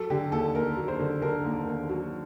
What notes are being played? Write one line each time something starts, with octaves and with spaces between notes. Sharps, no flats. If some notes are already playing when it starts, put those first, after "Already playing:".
Already playing: F#3 A4
D3 G4
D#2 A4
D#2 A#4
F#3
C5
D3
D3 A#4
D#2
D#2
F#3